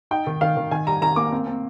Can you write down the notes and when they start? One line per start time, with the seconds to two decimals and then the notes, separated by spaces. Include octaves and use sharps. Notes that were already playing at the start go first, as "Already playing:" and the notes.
0.11 D#4 G5
0.27 D#3
0.41 D#3 F5
0.57 D#3
0.71 D#3 G#5
0.87 G3 A#5
1.02 D#3 A#5
1.16 A#3 D6
1.32 C4
1.47 C4